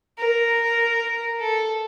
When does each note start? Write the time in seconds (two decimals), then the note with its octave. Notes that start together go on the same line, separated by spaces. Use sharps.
0.19 A#4
1.40 A4